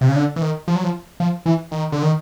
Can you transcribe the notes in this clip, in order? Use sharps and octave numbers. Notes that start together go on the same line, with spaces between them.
C3
C#3
D3
E3
D#3
F3
F#3
F3
F3
E3
D#3
D3
D#3